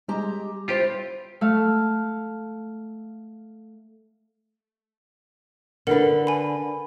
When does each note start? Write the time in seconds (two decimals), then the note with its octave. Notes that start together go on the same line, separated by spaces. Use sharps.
0.08 G3 G#3 G4 A#5
0.68 E4 F4 G4 C5
1.41 A3 F5
5.87 D3 D4 A#4 B4 F#5
6.27 G#5 B5